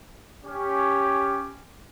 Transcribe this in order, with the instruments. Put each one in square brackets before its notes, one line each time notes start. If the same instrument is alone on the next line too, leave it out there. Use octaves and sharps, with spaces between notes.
[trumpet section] C#4 G4